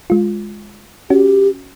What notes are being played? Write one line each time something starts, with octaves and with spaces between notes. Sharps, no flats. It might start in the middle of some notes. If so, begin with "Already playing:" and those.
G#3 F4
C#4 F#4 G4